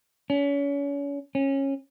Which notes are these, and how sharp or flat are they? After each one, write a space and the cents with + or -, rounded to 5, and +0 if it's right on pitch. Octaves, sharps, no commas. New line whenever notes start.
C#4 +35
C#4 -20